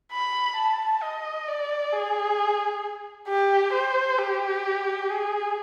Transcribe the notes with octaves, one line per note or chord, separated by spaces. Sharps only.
B5
A5
D#5
D5
G#4
G4
C5
G4
G#4